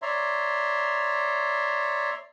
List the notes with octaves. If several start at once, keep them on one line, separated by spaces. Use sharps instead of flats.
C#5 D5 E5 A#5 C6